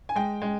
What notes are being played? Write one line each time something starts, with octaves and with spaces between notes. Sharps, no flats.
G#5
G#3 G5
G#3